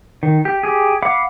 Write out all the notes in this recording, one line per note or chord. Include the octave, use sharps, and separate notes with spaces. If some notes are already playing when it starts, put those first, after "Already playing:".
D#3
G4
G4 G#4
F5 F#5 B5 D6